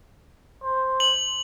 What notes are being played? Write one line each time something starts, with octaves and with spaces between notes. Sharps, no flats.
C5
F#7